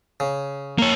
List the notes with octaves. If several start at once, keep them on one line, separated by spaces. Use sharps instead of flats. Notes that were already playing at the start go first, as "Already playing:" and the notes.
C#3
A#3 C#5